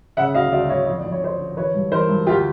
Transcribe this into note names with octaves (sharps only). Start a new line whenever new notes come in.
C#3 E5 F#5
D2 D#5 F5
D2 D5 E5
D2 C#5 D#5
F2 D#5
D5
F2
C#5
D3 C5 D5
D3
E3 B4 C#5
G2
E3 A#4 C5
G2
D2 F4 G4